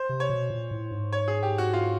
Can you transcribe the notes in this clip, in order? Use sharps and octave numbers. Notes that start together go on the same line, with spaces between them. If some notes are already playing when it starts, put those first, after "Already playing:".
Already playing: C5
C3
C#5
B2
A#2
A2
G#2
C#5
G#4
G4
F#4
F4